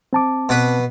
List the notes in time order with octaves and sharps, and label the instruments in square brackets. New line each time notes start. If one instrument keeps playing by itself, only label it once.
[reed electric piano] C4 A5 D6
[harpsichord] B2 B4